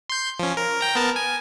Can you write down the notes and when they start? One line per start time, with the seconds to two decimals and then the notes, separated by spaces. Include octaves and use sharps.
0.10 C6 G6
0.39 F3 C#4
0.57 A#4
0.81 G5 A#5
0.95 B3 A#4 A5
1.16 G#5